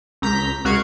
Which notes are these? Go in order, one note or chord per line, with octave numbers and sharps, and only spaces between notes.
C#2 A#5 G6 B6
C#2 F#4 F5 F#6 G#6 D7